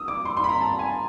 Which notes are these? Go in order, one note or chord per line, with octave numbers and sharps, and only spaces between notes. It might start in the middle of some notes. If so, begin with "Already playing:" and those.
Already playing: D#6 E6
D6
C6
C6
B5
A#5
A5
G#5